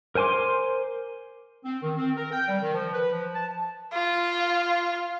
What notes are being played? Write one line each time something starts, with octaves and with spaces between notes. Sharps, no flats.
A#4 C5 G#5 C6 D6
C4
D#3
C4
A#4
G5
G3
D#3
F3
B4
F3
A5
F4